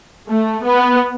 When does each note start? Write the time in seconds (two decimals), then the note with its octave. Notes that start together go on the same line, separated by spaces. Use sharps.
0.28 A3
0.64 B3